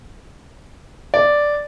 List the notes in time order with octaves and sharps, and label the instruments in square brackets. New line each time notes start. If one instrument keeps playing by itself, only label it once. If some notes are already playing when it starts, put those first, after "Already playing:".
[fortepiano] D5